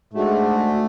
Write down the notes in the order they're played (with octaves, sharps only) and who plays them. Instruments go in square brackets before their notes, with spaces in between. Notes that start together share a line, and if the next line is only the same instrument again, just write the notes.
[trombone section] G#2 G#3 D4 F#4 [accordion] A3